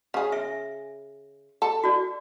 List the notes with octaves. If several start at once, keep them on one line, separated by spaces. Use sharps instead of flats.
C#3 G#4
E5
A4
F#4 D5